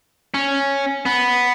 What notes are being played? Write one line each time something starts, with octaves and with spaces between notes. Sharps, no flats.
C#4
B3